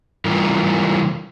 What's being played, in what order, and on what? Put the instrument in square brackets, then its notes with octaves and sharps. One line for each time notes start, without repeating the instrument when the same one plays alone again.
[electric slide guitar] E3 G3 A3 F4 A#4